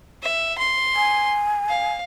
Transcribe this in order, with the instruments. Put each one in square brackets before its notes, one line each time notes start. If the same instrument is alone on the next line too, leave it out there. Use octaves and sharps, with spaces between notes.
[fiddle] E5
C6
[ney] G#5
[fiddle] F5